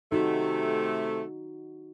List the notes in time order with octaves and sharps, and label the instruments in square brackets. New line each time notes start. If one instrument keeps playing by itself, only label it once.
[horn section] C3 A3 [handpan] D#4 F#4